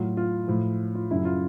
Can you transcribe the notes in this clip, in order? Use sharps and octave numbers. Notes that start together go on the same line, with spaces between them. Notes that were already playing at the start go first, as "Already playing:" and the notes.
Already playing: A2 F#3 F4
F4
A2 F3
F4
F#2 C#3 F#3 E4
F4